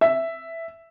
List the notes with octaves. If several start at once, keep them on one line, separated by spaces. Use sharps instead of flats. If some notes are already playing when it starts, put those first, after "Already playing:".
E5